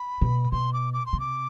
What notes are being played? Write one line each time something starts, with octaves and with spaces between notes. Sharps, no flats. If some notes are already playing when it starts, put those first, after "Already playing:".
Already playing: B5
B2
B2 C6
D6
D6
C6
C3
D6